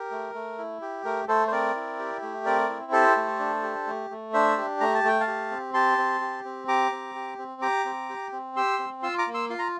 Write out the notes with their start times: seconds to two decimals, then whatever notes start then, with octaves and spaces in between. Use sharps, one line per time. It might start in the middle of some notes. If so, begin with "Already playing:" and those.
Already playing: G4 A#4
0.11 A3
0.34 A3
0.58 E4
0.81 G4
1.05 A3 A#4
1.28 A3 A4 C5
1.47 C5
1.52 C4 A#4 D5
1.75 E4
1.99 G4
2.22 A3
2.45 C4 A#4 D5
2.69 E4
2.92 G4 A4 C5
3.17 A3
3.39 D4
3.63 G4
3.87 A3
4.10 A3
4.33 D4 C5 E5
4.57 G4
4.80 A3 A#5
4.94 A5
5.04 A3 G5
5.21 F5 A5
5.28 G4
5.51 C4
5.74 G4 A5 C6
5.98 C4
6.21 G4
6.45 C4
6.68 G4 A#5 D6
6.92 C4
7.15 G4
7.38 C4
7.62 G4 A#5 D6
7.85 C4
8.09 G4
8.32 C4
8.56 G4 C6 E6
8.79 C4
9.02 F4 C6 E6
9.18 A#5 D6
9.27 A#3
9.34 C6 E6
9.50 F4 C6
9.59 A#5